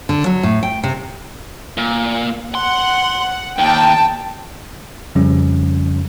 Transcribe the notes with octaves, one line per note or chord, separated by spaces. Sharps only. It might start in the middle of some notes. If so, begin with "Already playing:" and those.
D3
F#3
A2
G5
C3
A#2
F#5 C6
D#2 G5 A5
F2 C#3 F3 G3 C#4